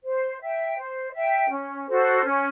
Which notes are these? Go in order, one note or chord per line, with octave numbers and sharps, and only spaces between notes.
C5
E5 G5
C5
E5 G5
C#4
F#4 A4 C5
C#4